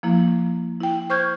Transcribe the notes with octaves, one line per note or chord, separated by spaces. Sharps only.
F3 A#3 E4
E4 G5
C5 C#6 F6 G6 G#6